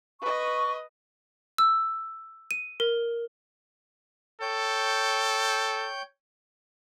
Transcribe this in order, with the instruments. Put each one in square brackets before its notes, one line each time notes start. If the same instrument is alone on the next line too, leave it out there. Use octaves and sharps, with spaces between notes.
[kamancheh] B4 D#5 [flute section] C#6
[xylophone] E6
D#7
A#4
[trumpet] A4 [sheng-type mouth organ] C#5 G5 G6